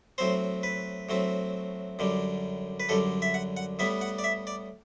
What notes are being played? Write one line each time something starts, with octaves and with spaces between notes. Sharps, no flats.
A2 F#3 C4 C5
B4
A2 F#3 C4
F#2 D3 G3
B4
F#2 D3 G3 A4
E5
F#5
F#5
A2 G3 B3 E5
F#5
D5
E5
D5